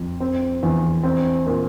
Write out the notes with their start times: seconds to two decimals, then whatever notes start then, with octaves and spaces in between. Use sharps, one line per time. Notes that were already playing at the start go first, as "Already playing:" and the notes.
Already playing: F2
0.20 C4
0.63 E2
1.03 C4
1.46 A#2